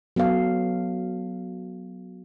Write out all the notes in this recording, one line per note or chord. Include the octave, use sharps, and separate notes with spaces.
F#3 B3 A4 F5